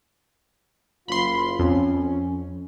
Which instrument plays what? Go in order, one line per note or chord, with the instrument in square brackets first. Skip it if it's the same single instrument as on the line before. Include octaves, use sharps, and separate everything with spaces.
[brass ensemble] F#1 F4 [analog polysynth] B5 C6
[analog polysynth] F2 [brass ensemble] C#4